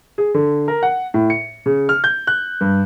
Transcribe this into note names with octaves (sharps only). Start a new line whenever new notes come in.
G#4
D3
A#4
F#5
A2
C#7
C#3
F6
G6
F#6
G2